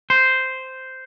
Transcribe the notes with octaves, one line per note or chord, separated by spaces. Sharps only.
C5